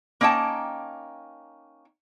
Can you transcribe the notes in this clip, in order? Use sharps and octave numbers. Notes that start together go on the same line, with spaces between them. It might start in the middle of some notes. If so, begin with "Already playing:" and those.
A#3 C#4 D#4 G5 A5